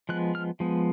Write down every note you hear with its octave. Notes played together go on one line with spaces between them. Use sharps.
F3 G#3 B3 F#6
F6
F3 G#3 B3